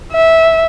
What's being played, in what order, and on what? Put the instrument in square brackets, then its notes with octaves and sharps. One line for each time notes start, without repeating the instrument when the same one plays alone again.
[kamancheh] E5